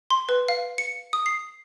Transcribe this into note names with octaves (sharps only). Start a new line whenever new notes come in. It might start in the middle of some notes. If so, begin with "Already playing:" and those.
C6
B4
F5
C#7
D#6
C7